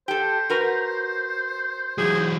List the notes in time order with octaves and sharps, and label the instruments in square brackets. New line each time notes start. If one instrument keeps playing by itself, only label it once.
[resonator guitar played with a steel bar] G4 A4 [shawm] C5
[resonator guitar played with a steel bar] F#4 A#4 B4
[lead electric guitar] E3 F#3 [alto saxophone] G#4